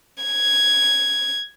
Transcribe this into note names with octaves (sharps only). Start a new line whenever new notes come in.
G#6